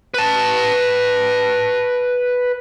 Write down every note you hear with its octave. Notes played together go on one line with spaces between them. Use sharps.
B4 A5